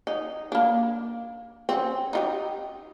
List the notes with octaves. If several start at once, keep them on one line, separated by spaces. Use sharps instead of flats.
D#4
A#3 D4
C4 C#4
D#4 F4 G4